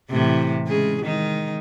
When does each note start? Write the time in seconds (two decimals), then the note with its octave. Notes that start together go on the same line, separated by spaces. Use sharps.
0.10 A2 C3 E3
0.67 C#3 G#3 G#4
1.03 D#3 G#3 D#4